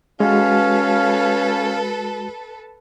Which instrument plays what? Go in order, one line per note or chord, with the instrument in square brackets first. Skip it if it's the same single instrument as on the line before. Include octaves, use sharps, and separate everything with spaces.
[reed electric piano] G#3 F#4 [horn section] C#4 F5 [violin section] A4 B4